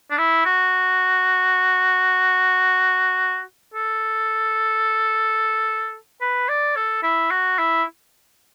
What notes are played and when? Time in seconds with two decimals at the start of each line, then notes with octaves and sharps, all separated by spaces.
0.10 D4
0.18 E4
0.45 F#4
3.74 A4
6.21 B4
6.48 D5
6.76 A4
7.03 E4
7.30 F#4
7.59 E4